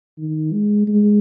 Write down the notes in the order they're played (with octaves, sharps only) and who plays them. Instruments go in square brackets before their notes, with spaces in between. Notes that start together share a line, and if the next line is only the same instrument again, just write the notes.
[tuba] D#3
G#3
G#3